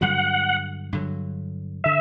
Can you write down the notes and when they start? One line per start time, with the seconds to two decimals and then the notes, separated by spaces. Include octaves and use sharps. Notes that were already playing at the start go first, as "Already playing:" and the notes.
0.01 G2 D3 F#3 F#5
0.93 G2 D3 F#3
1.84 D3 E5